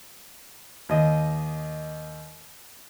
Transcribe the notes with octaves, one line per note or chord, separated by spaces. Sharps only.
D#2 D#5